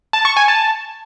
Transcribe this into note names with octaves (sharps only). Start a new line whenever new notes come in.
A5
C#6
G#5
A5